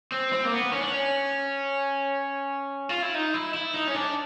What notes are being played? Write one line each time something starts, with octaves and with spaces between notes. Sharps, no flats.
C4
C4
A#3
B3
C#4
D4
C#4
F4
E4
D#4
E4
E4
D#4
C#4
D4